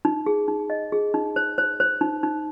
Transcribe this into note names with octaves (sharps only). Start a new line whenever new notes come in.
D#4
G#4
D#4
D#5
G#4
D#4
C5
C5
C5
D#4
D#4